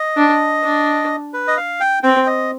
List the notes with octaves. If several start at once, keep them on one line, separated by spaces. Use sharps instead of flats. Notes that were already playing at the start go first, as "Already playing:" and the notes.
Already playing: D#5
D4
D4
B4
D#5
F5
G5
C4 G5
D#5